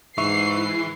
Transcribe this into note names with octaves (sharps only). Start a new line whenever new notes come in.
G#2 E3 E5 C#6 C7